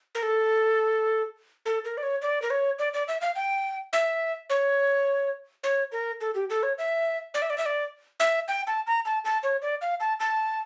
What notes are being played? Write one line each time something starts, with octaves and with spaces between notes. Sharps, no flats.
A#4
A4
A4
A#4
D5
C#5
D5
A#4
C#5
D5
D5
E5
F5
G5
E5
C#5
C#5
A#4
A4
G4
A4
C#5
E5
D5
E5
D5
E5
D5
E5
G5
A5
A#5
A5
A5
C#5
D5
F5
A5
A5